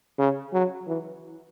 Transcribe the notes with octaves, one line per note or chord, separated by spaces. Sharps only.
C#3
F#3
E3